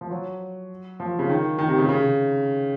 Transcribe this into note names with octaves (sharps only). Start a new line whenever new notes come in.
F3
F#3
F3
C#3
D#3
D#3
C3
C#3
C#3